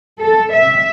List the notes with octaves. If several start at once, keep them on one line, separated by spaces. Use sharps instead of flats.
A4
E5